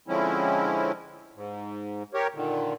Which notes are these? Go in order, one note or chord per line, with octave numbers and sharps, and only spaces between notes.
D3 F3 G#3 C4 C#4 E4
G#2
G4 A#4 C#5
A#2 D3 D#3